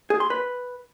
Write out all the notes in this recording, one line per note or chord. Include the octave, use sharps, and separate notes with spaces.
G#4
C6
B4